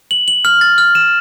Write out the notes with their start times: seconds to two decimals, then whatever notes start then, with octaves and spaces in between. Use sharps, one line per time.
0.11 F#7
0.28 F#7
0.45 F6
0.61 A6
0.78 F6
0.95 E7